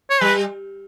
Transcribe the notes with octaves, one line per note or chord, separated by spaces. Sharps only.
C#5
G3 B4